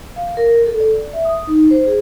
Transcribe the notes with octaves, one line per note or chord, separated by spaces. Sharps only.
F5
A#4
A4
D5
E5
D#6
D#4
C5
G#4